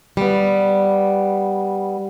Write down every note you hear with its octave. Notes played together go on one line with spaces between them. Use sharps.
G3 B3